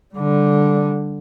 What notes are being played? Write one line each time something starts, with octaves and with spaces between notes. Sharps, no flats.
D3 G3